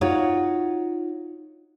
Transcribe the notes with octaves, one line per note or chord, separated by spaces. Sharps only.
D#4 F4 F#4 C#5